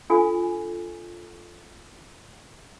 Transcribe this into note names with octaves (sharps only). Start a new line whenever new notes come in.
D4 F4 A4 G#5